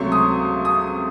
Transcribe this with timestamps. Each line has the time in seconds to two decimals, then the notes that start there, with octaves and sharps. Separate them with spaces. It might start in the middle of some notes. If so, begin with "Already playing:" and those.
Already playing: C#2 C3 F#3 A3 C6 C#6
0.12 D#6
0.65 D#6